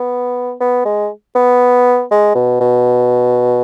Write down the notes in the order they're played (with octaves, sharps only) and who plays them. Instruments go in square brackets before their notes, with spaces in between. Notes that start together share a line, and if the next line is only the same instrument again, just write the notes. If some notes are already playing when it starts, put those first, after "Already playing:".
Already playing: [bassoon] B3
B3
G#3
B3
G#3
B2
B2